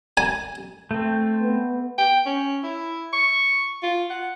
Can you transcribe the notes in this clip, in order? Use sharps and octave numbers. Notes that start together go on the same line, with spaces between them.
G#5
A3 C4
B3
G5
C#4
E4
C#6
F4
F#5